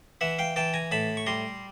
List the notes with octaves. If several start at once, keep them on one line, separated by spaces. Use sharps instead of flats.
E3 E5 F#5
F5 G5
E3 G5 A5
G#5 A#5
A2 A5 B5
C#6
G3 A#5 C6